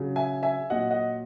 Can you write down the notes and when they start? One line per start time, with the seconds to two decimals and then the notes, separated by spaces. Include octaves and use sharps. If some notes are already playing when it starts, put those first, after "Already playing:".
Already playing: C#3 F#3
0.16 E5 G#5
0.43 E5 G#5
0.70 A#2 F#3 D#5 F#5
0.91 D#5 F#5